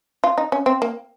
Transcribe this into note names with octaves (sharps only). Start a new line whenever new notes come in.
F4
D#4
C#4
C4
A#3